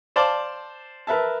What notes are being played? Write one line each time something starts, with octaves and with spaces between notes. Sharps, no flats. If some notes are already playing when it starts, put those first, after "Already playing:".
C5 D5 F5 A5 C6 D6
A#4 B4 E5 A5